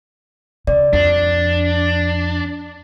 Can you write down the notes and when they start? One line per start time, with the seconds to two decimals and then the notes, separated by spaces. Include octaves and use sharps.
0.67 C#3 D5
0.93 F2 D4